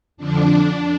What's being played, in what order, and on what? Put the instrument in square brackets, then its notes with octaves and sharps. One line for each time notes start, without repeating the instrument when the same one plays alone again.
[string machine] F2 D3 F3 D4